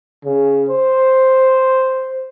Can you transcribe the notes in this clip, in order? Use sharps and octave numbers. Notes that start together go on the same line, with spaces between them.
C#3
C5